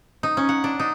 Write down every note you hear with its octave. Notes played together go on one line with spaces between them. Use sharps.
D#4
C#4
F#5
D4
D#4